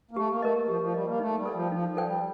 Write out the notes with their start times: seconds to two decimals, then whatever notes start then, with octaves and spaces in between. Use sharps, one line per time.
0.11 A#3
0.16 A3 G4
0.30 A#3
0.42 A3 A#4 D#5
0.68 F3 G4
0.81 F3
0.94 G3 A#4 D#5
1.07 A#3
1.19 A3 D#4
1.37 G3
1.45 A4 D5 G5
1.55 F3
1.72 F3 D#4
1.88 F3
1.97 A4 D5 G5
2.06 G3